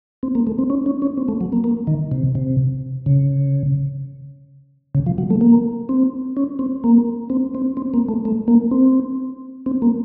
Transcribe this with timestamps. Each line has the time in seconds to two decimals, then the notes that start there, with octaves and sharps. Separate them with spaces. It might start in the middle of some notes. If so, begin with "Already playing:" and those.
0.23 C4
0.35 A#3
0.47 A3
0.58 C4
0.70 C#4
0.86 C#4
1.02 C#4
1.18 C4
1.28 A3
1.41 F#3
1.52 A#3
1.64 A#3
1.87 D#3
2.12 C3
2.35 C3
3.06 C#3
4.95 C#3
5.06 F3
5.18 F#3
5.30 A3
5.41 A#3
5.89 C4
6.37 C#4
6.59 C4
6.84 A#3
7.30 C4
7.55 C4
7.77 C4
7.94 A#3
8.09 A3
8.25 A3
8.48 A#3
8.71 C4
9.66 C4
9.82 A#3